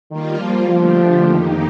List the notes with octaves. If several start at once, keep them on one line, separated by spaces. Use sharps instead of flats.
D#3 G3 A#3 F4
F3
D3 F3 A3 D4 G4
F2 D#3 A#3 D#4 G4